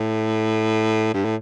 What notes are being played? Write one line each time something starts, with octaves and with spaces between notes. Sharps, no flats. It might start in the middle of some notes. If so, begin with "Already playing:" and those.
Already playing: A2
G2
A2